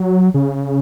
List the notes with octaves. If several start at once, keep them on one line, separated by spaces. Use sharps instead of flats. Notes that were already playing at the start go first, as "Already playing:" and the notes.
Already playing: F#3
C#3